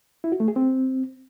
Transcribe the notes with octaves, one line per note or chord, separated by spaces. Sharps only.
E4
F#4
A3
G#4
C4